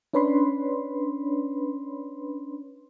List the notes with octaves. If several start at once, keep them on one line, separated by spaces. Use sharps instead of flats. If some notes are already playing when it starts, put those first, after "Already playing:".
C#4 D4 B4 C#5 B5 C6